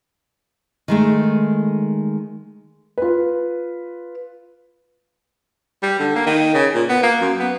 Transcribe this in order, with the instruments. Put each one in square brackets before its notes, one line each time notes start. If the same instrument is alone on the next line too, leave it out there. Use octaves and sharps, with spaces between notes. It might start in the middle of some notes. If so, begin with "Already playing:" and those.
[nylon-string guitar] D#3 G#3 A3
[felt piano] F4 B4
[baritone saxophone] G3
D3
A#3
D#3
C#3
A#2
B3
A#3
F#2
B3